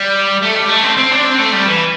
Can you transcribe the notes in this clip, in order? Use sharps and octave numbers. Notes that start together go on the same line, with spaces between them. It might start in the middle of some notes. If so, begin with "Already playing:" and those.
Already playing: G3
A3
G3
A3
C4
C4
D4
C4
A3
G3
E3